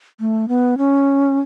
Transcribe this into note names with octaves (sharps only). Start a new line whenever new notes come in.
A3
B3
C#4